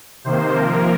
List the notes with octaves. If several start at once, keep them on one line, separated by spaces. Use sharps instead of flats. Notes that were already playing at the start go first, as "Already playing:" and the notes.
C3 D#3 A#3 C5
C3 F3 A#3 A#4